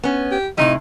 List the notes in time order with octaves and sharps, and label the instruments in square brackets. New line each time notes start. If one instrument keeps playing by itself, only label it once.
[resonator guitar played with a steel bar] B3 C#4
[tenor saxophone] G4
[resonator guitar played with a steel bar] A2 C3 G3 [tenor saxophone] D#4